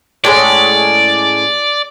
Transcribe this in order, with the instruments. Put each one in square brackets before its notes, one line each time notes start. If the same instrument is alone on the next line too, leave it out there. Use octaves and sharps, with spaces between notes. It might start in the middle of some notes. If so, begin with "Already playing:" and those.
[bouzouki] A2 G#3 C#4 [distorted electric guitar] D5